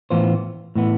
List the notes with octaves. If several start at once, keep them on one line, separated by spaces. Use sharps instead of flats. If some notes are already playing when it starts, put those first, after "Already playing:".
A2 E3 B3 F4 C5
A2 E3 B3